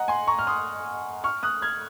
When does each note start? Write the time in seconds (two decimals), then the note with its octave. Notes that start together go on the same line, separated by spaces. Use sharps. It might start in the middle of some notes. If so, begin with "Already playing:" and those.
Already playing: D#5 F#5 A#5
0.08 G#5 C6
0.28 A#5 C#6
0.39 F6
0.47 C6 D#6
1.24 C#6 F6
1.43 D#6 F#6
1.62 F6 G#6